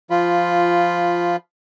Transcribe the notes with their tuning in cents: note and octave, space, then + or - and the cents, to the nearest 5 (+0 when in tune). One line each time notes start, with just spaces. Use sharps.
F3 -10 F4 +0 B5 +0